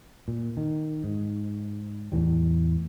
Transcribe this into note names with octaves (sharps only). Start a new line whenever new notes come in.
A#2
D#3
G#2
E2 A2 E3 G3